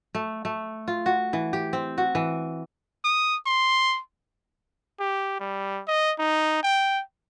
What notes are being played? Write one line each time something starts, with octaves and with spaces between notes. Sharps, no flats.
A3
A3
F4
F#4
E3
G4
C4
F#4
E3
D#6
C6
G4
G3
D#5
D#4
G5